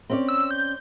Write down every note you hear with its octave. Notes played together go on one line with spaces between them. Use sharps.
C4 C#4 D5
E6
G6